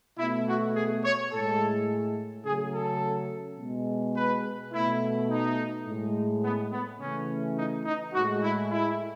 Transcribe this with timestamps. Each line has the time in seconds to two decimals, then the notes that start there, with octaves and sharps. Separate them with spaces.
0.18 B2 A3 E4
0.47 F#4
0.75 G#4
1.03 C#5
1.31 A2 G#3 A4
2.45 C#3 F#3 A3 G#4
2.73 A4
3.59 B2 G#3
4.16 B4
4.72 B2 A3 E4
5.29 D#4
5.86 A2 G#3
6.43 B3
6.71 B3
6.99 C#3 E3 A3 C#4
7.56 D#4
7.85 D#4
8.13 A2 G#3 F#4
8.41 E4
8.70 E4